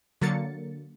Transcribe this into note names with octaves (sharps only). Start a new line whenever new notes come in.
D3 F#3 A#3 A6 C#7